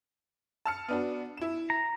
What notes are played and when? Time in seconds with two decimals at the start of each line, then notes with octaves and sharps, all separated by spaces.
0.65 A5 F6 C#7
0.88 B3 D4 F#4
1.37 E4 E7
1.70 A#5